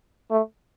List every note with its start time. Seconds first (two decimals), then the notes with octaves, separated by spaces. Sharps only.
0.31 A3